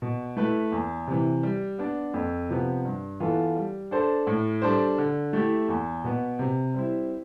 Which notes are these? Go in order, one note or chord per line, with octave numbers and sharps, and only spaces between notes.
B2
A3 E4 B4
E2
C3 E3
G3
B3 D4
F2
C3 F3 B3
G2
E3 B3 F4 A4
G3
D4 A4 C5
A2
G3 D4 A4 C5
D3
A3 E4 G4
E2
B2 B3
C3
G3 C4 E4